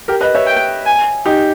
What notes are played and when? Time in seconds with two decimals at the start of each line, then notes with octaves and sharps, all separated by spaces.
0.08 G4 A#4
0.21 B4 D#5
0.35 C#5 E5
0.47 G5
0.86 G#5
1.25 D#4 G4